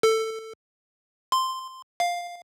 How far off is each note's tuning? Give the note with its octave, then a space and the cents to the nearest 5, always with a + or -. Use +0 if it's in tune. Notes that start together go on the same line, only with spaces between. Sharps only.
A4 +15
C6 -5
F5 +5